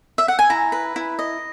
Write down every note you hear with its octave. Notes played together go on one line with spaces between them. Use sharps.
E5
F#5
G#5
E4 A#5
B4
E4
D#5